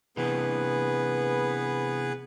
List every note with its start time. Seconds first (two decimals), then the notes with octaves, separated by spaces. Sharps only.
0.17 C3 E3 B3 G#4 B4